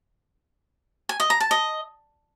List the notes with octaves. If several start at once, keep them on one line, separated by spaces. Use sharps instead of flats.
G#5
D#5
A#5
A5
D#5